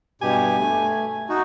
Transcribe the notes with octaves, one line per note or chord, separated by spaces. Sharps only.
G2 B2 G4 G#5
A3
D#4 F#4